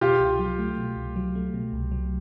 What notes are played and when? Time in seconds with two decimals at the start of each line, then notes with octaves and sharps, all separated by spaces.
0.01 B2 F4 G4
0.20 C2
0.39 F#3
0.59 A3
0.78 B2
0.96 C2
1.16 F#3
1.35 A3
1.54 B2
1.73 C2
1.92 F#3